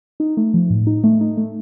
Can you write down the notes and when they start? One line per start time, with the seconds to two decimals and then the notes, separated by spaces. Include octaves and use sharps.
0.20 D#4
0.37 A3
0.54 F3
0.70 A2
0.87 D#4
1.04 A3
1.21 D#4
1.37 A3